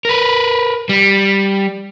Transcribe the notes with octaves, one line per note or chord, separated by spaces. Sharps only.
A#4 B4
G3